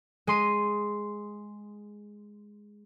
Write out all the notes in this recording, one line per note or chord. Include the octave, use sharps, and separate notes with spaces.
G#3 C6 D#7